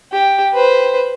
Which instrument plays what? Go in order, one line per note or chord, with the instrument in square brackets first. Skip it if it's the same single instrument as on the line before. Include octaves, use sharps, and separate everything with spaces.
[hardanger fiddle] G4
B4 C5